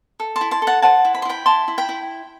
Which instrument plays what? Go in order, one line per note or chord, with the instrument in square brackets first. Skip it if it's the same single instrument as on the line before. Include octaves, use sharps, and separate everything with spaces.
[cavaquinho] A4
A5 C6
E4
A5 C6
A4
F#5 A5
C5 F#5 A5
E4
B5
C6
E4 G5 B5
E4 A5 C6
E4
G5 B5
E4